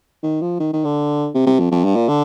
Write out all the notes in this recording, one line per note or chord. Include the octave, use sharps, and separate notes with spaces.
D#3
F3
D#3
D#3
D3
C3
C3
F2
F2
G2
A#2
D3